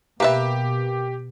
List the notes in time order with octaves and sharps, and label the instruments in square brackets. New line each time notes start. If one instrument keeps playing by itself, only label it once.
[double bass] B2 [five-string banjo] A#3 B4 E5 [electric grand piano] G4